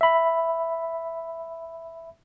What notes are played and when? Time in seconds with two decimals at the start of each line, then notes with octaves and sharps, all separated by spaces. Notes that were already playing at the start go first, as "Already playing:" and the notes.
0.01 E5 B5